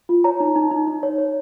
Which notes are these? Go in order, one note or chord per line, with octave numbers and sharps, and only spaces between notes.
F4
C#5 A#5
D#4
D#4
D#4
D#4
C#5
C#5